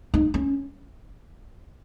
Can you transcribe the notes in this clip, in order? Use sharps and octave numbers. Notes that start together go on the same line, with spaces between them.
D#4
C#4